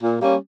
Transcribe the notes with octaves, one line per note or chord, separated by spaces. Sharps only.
A#2
G3 A#3 C#4